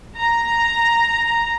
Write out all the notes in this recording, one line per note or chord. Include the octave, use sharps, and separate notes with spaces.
A#5